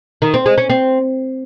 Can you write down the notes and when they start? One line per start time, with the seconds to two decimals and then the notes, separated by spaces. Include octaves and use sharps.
0.22 D#3
0.34 C4
0.46 G#3
0.58 C#4
0.70 C4